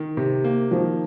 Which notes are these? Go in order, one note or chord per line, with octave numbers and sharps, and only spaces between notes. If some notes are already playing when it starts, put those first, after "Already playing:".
Already playing: D#3
C3
A#3
D#3 F3